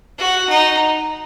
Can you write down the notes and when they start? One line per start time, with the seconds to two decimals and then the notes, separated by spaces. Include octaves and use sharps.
0.18 F#4
0.49 D#4